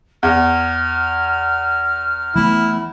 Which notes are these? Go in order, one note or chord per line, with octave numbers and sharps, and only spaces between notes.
E2 F6
E3 A3 B3 E4